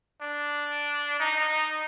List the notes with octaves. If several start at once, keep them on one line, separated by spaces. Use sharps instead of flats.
D4
D#4